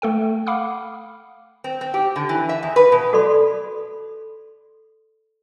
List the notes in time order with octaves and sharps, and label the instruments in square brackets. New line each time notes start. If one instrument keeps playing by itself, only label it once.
[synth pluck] A3 A4 G5
F5 F#5 B5 D6 D#6 F6
[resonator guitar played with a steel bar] C4
C4
G4
D3
E3
E5
E2
B4
B2
[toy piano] F#4 A4 D5 B5 C6